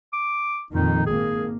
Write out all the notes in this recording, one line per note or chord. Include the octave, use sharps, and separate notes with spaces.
D6
F2 A#2 D#3 D#4
G#1 A#3 G#4